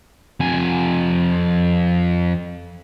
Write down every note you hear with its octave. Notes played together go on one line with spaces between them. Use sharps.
F2 G#5